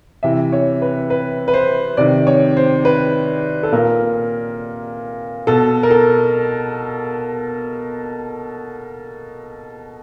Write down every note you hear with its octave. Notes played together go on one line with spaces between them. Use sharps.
C3 E3 E5
C#5
B4
B4
B4
C5
C3 D#3 D5
C#5
C5
B4
A4
A#2 A#4
B2 A4
A#4
A4